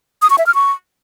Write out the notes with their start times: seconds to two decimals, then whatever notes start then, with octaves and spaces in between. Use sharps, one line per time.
0.22 D#6
0.30 C#6
0.38 E5
0.46 F6
0.55 C#6